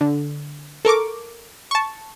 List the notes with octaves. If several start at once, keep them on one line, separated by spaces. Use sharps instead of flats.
D3
A4 A#4 C#6 D6
A5 C#6